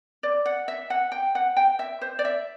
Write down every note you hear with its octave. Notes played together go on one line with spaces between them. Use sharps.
D5
F#5
E5
F#5
G5
F#5
G5
E5
C5
D5
E5